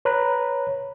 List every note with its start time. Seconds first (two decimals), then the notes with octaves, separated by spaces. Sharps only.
0.05 B4 C#5 A#5 B5 F#6